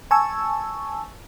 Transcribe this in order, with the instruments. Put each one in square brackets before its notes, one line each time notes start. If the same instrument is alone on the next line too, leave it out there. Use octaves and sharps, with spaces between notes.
[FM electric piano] G#5 A5 C#6 E6